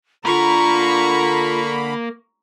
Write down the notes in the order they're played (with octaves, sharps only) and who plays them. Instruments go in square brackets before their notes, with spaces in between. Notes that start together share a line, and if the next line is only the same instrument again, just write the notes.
[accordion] D3 B5 [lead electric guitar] A#3 A#4 [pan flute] F4 [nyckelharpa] A#5 C#6